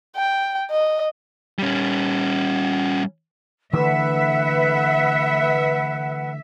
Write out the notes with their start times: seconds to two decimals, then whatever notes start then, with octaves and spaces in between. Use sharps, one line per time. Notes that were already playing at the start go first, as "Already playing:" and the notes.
0.16 G5
0.71 D#5
1.59 G3 C#4
3.73 D3 E3 A3 B4 E5 F#5